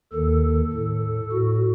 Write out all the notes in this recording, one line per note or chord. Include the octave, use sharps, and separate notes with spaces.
D#2 D#3 A4
A2
A2 F#4